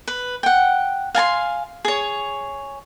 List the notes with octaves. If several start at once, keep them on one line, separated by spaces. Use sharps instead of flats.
B4
F#5 G5
F5 G#5 A5 C6
G#4 C#5